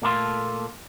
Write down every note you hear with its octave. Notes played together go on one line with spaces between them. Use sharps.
A#2 A3 A#3 A4 A#5 C6